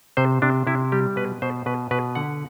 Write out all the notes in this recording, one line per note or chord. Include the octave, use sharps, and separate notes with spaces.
C3 C5
C3 D4
C3 E4
G3 G4
B2 B4
B2 C5
B2 B4
B2 B4
D3 F#5